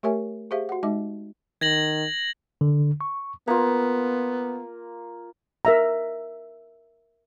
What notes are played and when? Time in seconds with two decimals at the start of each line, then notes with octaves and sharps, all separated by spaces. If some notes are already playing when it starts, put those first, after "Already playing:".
0.03 A3 G4 A#4 C#5 E5 G#5
0.51 G4 G#4 C5 E5 F5
0.69 F#4 F#5
0.83 G#3 D#4 E5 D6
1.61 D#3 G#6 A#6 F#7
2.61 D3
3.01 C#6
3.47 A#3 B3 F4
5.65 A#4 E5 A#5